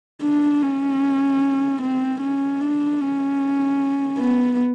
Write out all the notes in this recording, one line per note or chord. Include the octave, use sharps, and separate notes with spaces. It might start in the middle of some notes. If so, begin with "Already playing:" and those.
D4
C#4
C4
C#4
D4
C#4
B3